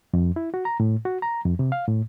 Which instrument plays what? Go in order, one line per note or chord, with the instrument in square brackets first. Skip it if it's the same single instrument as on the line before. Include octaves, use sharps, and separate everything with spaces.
[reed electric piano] F2
E4
F#4
A#5
A2
F#4
A#5
F2
C3
F5
A2